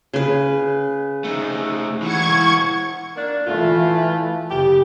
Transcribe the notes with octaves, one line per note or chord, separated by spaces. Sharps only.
C#3 B4
A3 D#4
E3 F#4 C#6 G#6
A#3 D4
E3 A3 E4 F4
F#1 C#3 G4